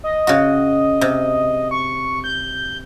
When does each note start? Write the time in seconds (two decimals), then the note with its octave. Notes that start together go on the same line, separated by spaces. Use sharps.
0.04 D#5
0.27 C#3 F#4
1.01 C3
1.71 C#6
2.24 G6